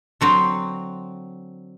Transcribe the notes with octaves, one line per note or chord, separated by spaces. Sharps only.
D3 F#3 C4